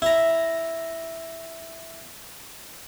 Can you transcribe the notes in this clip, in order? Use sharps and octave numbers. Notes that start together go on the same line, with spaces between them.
E4 A#5